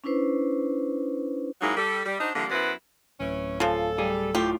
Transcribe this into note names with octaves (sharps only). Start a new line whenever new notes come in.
C#4 D4 E4 B4 C5
G#2 F#3 A#3 D#4 E4
G3 A4
G3
D4 D#4 F#4 C5 D#5
D3 E3 F3 G3 A#3
F#2 B3 E4 B4 C5
D1 E3 C#4
C#3 F3 F4 A4
G3 G#4
A2 F4 G4